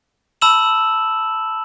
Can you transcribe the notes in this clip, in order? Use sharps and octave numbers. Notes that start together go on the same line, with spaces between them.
A5 B5 E6 E7 F#7